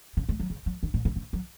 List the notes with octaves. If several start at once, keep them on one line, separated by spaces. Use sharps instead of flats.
C#3
G#3
F#3
C#3
F#3
D#3
A#2
C#3
C#3
F#3